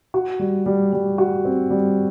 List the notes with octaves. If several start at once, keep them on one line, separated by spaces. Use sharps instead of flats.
F#4
G3
G3
G3
F#4
C4
G3